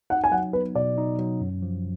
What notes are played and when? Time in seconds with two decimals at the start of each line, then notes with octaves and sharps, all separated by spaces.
0.10 D#4 F#5
0.24 G#5
0.32 F#3 F#5
0.53 B3 B4
0.75 B2 D5
0.98 D#4
1.18 F#3
1.41 F#2
1.62 F3